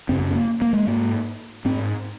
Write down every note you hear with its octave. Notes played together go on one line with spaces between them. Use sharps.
F#2 C#3 C4
C4
A#3
A#3
G#3
G#2 A#3
G#2 C4